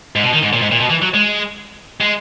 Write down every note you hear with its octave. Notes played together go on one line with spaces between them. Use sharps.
G#2
B2
D#3
G#2
A#2
G#2
A#2
B2
E3
F#3
G#3
G#3